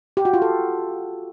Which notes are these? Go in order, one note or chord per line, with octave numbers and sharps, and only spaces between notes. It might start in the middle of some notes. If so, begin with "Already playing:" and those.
G4
F#4
F4
A4